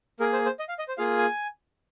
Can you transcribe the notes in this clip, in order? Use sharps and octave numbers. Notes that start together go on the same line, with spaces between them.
A#3 G#4 A#4
C5
C5
D#5
F5
D#5
C5
A#3 F4 G#4 F5
G#5